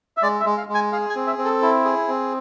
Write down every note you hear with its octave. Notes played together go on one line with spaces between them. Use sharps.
E5
G#3 D5
E5
G#3
F5
G#3
G#5
G#4 F5
G#5
C4
E5
C4
A4
E4
G#4
C4